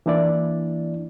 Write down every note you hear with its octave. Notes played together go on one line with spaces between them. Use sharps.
E3 A#3 D4 E4 D5